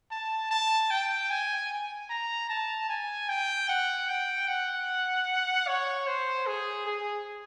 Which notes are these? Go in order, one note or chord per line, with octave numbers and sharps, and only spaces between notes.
A5
A5
G5
G#5
A#5
A5
G#5
G5
F#5
G5
F#5
C#5
C5
G#4
G#4